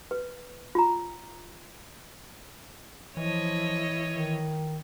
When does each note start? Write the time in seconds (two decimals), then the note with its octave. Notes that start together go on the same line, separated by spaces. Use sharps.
0.11 B4
0.75 F4 A#5
3.17 E3 F3 E4 C#5 D#5
4.11 D#3